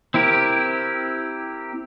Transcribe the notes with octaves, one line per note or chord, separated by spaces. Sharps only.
C4 E4 G4 A#4